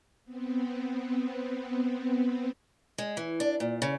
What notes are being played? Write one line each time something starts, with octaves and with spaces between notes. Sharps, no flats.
B3 C4
G#3
E3
D4
A#2
C#3